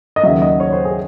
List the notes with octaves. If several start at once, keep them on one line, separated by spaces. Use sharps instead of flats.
D#5
D#2 C#3 F#3 E5
D#5
C#5
C5
G#4